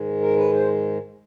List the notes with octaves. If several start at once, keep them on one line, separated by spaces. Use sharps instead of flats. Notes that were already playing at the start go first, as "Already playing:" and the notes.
Already playing: G#2 D#3 G#3
A#4
B4
C5